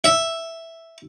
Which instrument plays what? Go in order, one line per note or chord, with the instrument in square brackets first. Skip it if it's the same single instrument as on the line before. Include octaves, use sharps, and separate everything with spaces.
[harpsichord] E5